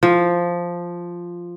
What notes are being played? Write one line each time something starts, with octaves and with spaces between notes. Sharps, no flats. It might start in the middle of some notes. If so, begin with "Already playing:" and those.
F3